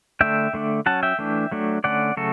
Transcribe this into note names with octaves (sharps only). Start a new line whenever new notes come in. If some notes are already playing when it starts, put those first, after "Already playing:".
D3 A3 D4 E5 G5
D3 A3 D4
F#3 C#4 F#5 A5
E5 G5
E3 A3 D4
F#3 A3 D4
D3 A3 C#4 D5 F#5
C#3 F#3 A3 F#4 A4